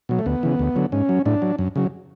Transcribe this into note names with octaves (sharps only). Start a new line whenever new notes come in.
B2 F#3
A3
D2 B3
C#3 E3
D2
D3 F#3
G#2 C#4
F#3
A2 D4
F#3
F#2
C#3 F#3